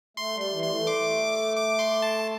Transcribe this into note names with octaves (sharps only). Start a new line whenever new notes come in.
A3 C6
G3
C6
E3
C6
A3
D6
D6
C6
A5